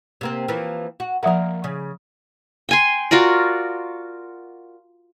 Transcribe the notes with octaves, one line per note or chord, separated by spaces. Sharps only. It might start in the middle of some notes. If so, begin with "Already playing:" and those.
C3 A#3 C4
E3 F3 A#3
F#4
F3 A#3 A#4 E5 F#5
C#3
G5 G#5 C6
F4 F#4 A#4 D5